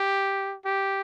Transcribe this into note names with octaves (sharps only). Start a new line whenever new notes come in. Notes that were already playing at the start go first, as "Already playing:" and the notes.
Already playing: G4
G4